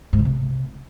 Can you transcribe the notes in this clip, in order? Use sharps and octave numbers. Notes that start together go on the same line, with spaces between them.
G#2
C#3
C3